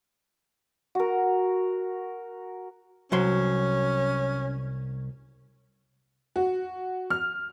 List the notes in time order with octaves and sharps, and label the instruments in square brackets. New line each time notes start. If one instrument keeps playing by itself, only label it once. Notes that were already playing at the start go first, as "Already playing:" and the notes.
[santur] F#4 A#4
[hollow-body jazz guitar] C2 F#3 C6 [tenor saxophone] C#4
[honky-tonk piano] F#4
F6